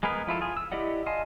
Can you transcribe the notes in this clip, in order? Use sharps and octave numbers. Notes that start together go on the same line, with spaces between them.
G#3 B3 G#4 A#4 B4
F3 E4 F4 A4
F4 G#4
E6
E4 G4 D5 D#5 F#5
D#5 F5 G#5 A5 C6